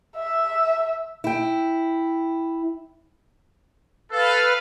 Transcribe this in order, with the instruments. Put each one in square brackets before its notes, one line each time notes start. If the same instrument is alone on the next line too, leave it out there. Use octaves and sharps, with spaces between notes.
[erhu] E5
[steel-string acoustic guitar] E4 G5
[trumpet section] A4 [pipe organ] B4 F5